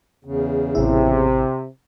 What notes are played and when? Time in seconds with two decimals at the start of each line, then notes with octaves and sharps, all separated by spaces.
0.25 E2 C#3
0.75 A1 C3 E4